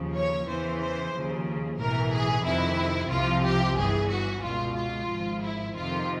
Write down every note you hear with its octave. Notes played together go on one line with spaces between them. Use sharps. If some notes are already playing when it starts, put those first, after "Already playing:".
Already playing: D#2 C#3 F3
C#5
E2 C#3 E3 C5
C5
D#2 C#3 F3
B1 A2 E3 A#4
G#4
F2 C3 D#3 E4
C2 C3 F3 F4
G4
G1 G2 E3 G#4
F#4
C#2 B2 F4
F4
G#1 G#2 F3
E4
F2 C3 D#3 F4